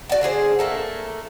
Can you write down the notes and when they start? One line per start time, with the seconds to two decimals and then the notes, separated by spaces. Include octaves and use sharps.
0.09 F#4 D5 G5 A5
0.21 D3 D4 G#4 C5
0.59 A3 A#3 A4